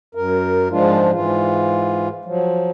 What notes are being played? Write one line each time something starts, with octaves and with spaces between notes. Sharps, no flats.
F#2 A#4
G#2 F3 G#3 D4 F4
G#2 E3 F4
F3 F#3